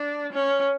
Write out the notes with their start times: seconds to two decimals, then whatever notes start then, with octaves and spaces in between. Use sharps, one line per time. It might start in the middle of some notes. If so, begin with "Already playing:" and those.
Already playing: D4
0.33 C#4